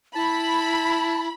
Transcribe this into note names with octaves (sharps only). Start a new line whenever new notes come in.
E4 A5 B5